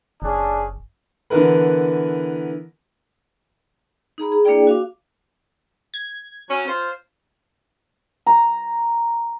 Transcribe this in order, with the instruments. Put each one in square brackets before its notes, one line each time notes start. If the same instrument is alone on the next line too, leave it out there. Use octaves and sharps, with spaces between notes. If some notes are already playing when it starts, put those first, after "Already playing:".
[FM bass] F#1 [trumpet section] C#4 D4 G#4
[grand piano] D3 E3 B3 E4 A#4 B4
[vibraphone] D#4 G#4 A#5 B5
G#4
A#3 D4 E4 G#4 D5 G5
F#4 F5 D6
[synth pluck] G#6
[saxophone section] F#3 C#4
F4 C5
[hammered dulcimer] A#5